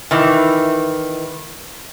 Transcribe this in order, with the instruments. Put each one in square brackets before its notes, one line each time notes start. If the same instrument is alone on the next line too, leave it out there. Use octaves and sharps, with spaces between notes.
[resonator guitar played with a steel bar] D#3 E3